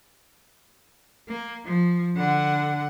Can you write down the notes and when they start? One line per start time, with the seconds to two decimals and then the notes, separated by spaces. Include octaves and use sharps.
1.28 A#3
1.65 F3
2.16 D3 F#5